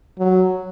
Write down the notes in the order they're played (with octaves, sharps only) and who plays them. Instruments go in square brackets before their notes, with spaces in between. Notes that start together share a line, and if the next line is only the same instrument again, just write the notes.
[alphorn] F#3